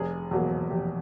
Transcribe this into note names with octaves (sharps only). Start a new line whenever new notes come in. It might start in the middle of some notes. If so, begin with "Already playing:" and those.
Already playing: F1 G#4
E2 B2 F#3 A#3
F1 G4